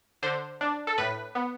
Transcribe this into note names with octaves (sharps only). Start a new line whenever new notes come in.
D3 C5
D4
A4
A2 B4
B3